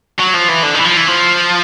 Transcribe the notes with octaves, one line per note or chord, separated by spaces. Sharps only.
F#3
F3
E3
D3
D#3
E3
F3
E3
F3